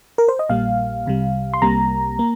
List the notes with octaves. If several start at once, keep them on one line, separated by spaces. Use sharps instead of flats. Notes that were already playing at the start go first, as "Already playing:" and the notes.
A#4
C5
D#5
A#1 A#2 G3 A#3 F5
C2 C3 G3
C6
C2 C3 G3 A#3 A#5
A#3